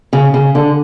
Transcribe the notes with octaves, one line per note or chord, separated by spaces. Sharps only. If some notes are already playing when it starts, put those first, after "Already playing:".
C#3
C#3
D3